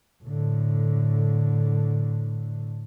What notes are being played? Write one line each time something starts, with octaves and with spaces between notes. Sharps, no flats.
A2 D3